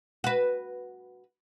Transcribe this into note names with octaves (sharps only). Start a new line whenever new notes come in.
F#4 B4